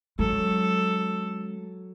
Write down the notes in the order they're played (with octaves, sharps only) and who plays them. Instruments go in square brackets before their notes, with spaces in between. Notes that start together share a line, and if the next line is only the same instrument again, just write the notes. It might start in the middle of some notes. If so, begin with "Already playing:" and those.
[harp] F#3 [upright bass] G#3 C#4 [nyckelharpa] A4